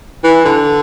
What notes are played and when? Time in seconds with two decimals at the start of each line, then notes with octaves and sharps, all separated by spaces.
0.24 E3
0.45 D3